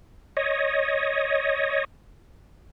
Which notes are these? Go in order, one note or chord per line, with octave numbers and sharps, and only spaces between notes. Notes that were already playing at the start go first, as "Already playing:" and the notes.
C#5 D#5